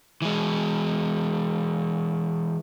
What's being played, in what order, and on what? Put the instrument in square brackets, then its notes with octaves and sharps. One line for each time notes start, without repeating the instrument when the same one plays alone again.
[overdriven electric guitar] E3 G#3